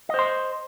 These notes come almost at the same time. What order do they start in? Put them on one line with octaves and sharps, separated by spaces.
D#5 C5 C6